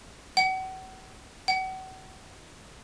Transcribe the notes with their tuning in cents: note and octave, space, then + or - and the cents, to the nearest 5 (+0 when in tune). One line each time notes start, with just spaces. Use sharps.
F#5 +35
F#5 +35